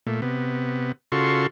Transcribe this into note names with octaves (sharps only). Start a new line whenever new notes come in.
A#2 A3
C3 B3
C#3 F4 F#4 A4 C6 C#6